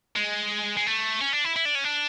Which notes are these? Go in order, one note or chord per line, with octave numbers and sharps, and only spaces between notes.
G#3
G#3
A3
C#4
D4
E4
E4
D4
C#4
D4